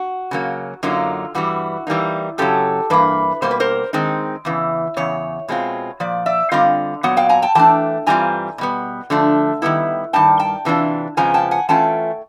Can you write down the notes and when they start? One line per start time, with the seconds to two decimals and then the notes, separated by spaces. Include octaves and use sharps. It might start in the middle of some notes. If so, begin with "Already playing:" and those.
Already playing: F#4
0.31 C#3 F#3 A#3
0.83 F#2 D3 F#3 A#3 D#4 F4
1.35 G2 E3 G3 F#4
1.87 E3 G3 A#3 D#4
2.38 F#2 C#3 F#3 G4 A4
2.90 G2 E3 A#3 B4
3.42 B2 G3 A#3 C5
3.51 B4
3.60 A#4 C5
3.93 D#3 G#3 C4 D#4
4.45 E2 C#3 E3
4.97 E2 C#3 C#5
5.48 B2 G#3 C4 F4
6.00 A#2 F3 D5
6.26 D5 E5
6.52 D3 G3 C4 F4 D#5 F5
7.03 A#2 F#3 B3 F#5
7.17 F5 G5
7.29 G#5 A#5
7.42 G5 A5
7.55 E3 A3 D4 G5 A5
8.06 G2 E3 G3 C4 F4 G#5 A#5
8.58 B2 G3 B3
9.10 D3 F3 A3 D4
9.62 D#3 G3 B3 E4
10.13 G2 D#3 G3 G5 A5
10.39 G5 A5
10.65 C3 E3 A3 D4 F4
11.17 F2 C#3 F3 G#3 B3 G#5 A#5
11.34 G5 A5
11.51 F#5 G#5
11.69 E3 A3 C#4 F4 G5 A5